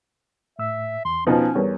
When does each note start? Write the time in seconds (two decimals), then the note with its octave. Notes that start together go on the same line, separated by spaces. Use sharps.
0.59 A2 E5 E6
1.05 E2 C6
1.27 B2 F3 C#4 D#4
1.55 E2 G3 A#4 C#5